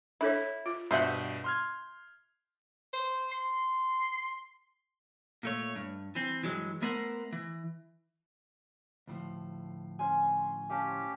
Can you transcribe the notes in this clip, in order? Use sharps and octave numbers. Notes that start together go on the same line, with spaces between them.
D4 E4 A4 C#5
F4
G2 B2 C5 E5 F#5 G6
C6 F6 G#6
C5
C6
A#2 A3 C#5
G2
E3 C4
G2 E3 F#3 G#3
A3 B3 A#4 C5 F#5
E3
D2 A2 F3
C#4 C5 G#5
C#4 G4 F5 A5